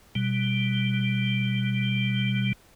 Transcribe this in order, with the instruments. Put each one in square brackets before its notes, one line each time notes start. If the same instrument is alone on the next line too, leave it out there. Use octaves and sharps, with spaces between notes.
[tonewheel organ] B2 G3